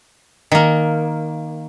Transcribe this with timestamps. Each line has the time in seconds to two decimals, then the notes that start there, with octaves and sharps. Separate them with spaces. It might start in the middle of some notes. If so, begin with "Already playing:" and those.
0.52 D#3 A#3